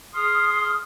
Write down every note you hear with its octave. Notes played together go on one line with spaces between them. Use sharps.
G#4 C6 D#6 F6